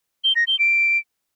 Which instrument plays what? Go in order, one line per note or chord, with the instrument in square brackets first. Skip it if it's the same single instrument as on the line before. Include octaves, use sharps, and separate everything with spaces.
[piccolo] G7
A#6
G7
D7